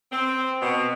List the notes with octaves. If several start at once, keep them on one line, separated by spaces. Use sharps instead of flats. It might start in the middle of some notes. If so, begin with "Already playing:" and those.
C4
B2